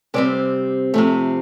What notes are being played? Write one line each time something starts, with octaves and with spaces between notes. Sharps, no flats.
C3 G3 C4 D5
C3 F3 A3